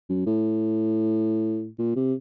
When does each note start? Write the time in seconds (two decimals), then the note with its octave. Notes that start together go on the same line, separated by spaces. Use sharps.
0.10 F#2
0.26 A2
1.79 A#2
1.96 C3